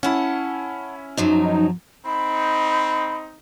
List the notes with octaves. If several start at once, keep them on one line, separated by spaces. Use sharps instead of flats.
C#4 E4 F#5 A5
F#2 F3 F#3 D#4
C4 D#4 B5